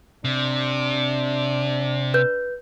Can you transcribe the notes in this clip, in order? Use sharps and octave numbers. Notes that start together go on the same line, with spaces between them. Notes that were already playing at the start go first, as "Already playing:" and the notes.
C3 D4
B4 G6